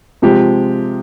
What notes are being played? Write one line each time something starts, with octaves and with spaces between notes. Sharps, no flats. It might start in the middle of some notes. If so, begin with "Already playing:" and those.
C3 F3 G#3 G4